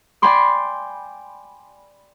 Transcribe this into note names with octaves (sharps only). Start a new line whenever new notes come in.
D5 G5 G#5 B5 C6 D6